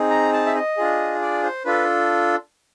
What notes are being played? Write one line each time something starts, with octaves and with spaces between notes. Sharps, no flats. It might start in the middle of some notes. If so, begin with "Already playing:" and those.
Already playing: C4 D#4 G#4
A#5
A5
E5
D#5
D4 F4 G#4
D5
C5
D4 F4 A4 B4